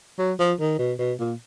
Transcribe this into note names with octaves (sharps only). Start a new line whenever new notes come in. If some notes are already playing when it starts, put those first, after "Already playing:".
F#3
F3
D#3
B2
B2
A#2